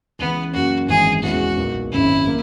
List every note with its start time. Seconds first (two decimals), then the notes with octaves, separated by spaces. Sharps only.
0.19 C#2 C#3 E3 B3
0.53 F#2 C#3 F#3 A#3 C#4 F#4
0.88 G#1 F#2 E3 G#3 B3 G#4
1.23 E2 B2 G#3 C#4 E4 F#4
1.58 B1 A#2 A#3 D#4
1.92 G#1 F#2 C#3 E4
2.27 A#3